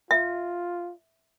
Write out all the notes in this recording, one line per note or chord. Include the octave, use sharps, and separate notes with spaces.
F4 E5